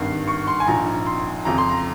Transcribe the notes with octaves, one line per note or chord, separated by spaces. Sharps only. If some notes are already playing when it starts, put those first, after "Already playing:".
Already playing: G#1 G2 D#3 C7
C#6
C6
G#5
A#1 G#2 F3 A#5
C6
F2 C#3 F3 A#5
C6
A#5